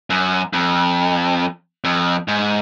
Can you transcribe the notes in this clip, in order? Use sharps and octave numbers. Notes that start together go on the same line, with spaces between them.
F#2
F2
F2
G#2